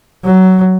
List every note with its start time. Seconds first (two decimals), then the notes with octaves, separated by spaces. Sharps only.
0.24 F#3